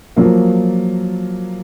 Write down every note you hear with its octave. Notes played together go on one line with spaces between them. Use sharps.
F3 F#3 A#3